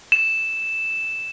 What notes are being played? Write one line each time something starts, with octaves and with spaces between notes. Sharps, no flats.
E7